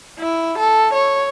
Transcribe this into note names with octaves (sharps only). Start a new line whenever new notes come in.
E4
A4
C#5